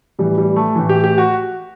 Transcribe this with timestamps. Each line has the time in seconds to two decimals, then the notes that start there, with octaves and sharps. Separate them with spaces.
0.19 A2 E3 G3
0.38 G3
0.56 A3
0.75 A2 E3
0.89 G4
1.04 G4
1.18 F#4